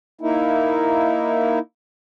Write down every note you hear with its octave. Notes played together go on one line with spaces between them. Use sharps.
A#3 D#4 E4